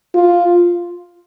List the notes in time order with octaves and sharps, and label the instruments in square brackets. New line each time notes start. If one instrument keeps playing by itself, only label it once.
[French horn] F4